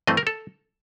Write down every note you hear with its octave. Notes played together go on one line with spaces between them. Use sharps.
G2 E3 A3 C4 D#5
A#4
A4